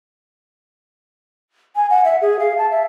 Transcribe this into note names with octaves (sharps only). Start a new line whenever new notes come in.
G#5
F#5
E5
G#4
F5
A5
E5